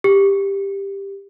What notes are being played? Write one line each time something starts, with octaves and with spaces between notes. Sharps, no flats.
G4